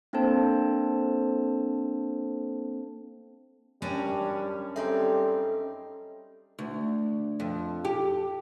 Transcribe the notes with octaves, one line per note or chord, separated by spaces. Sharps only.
A#3 C4 D4 A4 C5 A5
F#2 G3 C#4 D4 A5
G3 C4 D#4 G#4 A4 E5
D2
F2
G4